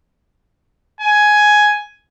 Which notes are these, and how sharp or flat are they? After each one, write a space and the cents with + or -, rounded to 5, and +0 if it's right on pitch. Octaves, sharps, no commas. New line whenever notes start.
G#5 +10